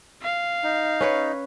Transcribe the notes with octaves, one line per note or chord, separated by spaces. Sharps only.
F5
D#4
C#4 B4 C#5